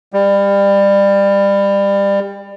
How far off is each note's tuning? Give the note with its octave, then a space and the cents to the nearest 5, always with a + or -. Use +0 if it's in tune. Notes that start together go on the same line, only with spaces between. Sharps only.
G3 +25